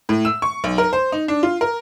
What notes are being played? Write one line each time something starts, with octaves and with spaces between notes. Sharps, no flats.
A2
E6
C#6
B1
A#4
C5
D#4
D4
F4
A#4